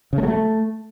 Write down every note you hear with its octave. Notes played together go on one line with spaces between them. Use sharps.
C#3
A3
F#3
A3